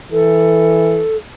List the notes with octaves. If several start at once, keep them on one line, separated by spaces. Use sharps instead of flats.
E3 A4